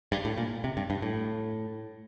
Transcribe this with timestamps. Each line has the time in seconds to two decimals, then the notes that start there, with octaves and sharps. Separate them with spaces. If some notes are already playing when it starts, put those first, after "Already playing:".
0.12 G2
0.25 A2
0.37 A#2
0.64 C3
0.77 G2
0.90 G2
1.02 A2